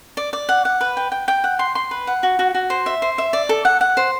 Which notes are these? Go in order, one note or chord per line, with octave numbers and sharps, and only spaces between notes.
D5
D5
F#5
F#5
B4
G5
G5
G5
F#5
C6
C6
B4
F#5
F#4
F#4
F#4
C5
E5
C5
E5
D5
A4
F#5
F#5
C5